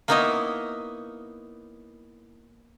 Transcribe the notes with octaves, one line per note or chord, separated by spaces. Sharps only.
A#3 B3 D#4 E4 C#5 D#5